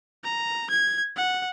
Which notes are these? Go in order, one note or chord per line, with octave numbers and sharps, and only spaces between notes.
A#5
G#6
F#5